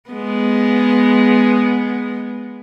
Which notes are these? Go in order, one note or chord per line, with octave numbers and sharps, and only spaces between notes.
G#3 B3